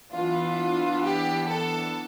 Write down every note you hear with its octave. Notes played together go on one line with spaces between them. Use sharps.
E3 B3 D4 F4
G4
A4